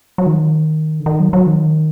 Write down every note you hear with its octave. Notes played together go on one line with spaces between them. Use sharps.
F#3
D#3
D3
D#3
F#3
F#3
D#3